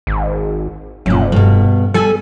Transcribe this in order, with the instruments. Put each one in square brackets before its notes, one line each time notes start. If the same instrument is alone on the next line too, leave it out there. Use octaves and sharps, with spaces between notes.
[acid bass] G#1
[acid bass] F1 [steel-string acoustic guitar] F#2 A#2
[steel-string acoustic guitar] G2 B2
[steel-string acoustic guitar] G3 G#5 [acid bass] A4